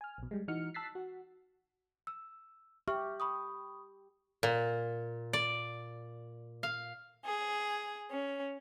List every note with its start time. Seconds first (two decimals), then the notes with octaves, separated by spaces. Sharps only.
0.01 G#5 F6
0.18 A#1 B2
0.31 G3 G#3
0.48 E3 D#4 F#4 F6 C#7
0.74 A5 E6 F#6 A6 B6 C7
0.95 F#4 F#5
2.07 E6
2.88 G4 E5 C#6 F6
3.20 B5 C#6 D#6
4.43 A#2
5.33 D5
6.63 F5
7.24 G#4
8.11 C#4